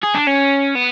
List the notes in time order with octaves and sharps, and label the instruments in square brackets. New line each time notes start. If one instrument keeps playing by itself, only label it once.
[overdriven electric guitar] G#4
D4
C#4
B3